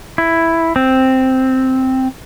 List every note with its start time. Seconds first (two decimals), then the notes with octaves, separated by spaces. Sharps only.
0.18 E4
0.76 C4